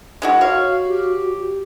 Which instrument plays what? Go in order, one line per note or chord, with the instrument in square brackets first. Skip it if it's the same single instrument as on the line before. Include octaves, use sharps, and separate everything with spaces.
[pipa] G#3 E4 F#4
[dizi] F#4 [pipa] C#5 [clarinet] F5
[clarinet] G4